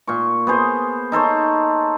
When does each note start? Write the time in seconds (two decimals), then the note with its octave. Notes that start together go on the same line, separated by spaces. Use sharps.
0.07 A#2 C#6
0.47 B3 G#4 C5
1.12 D#4 A4 C5 C#5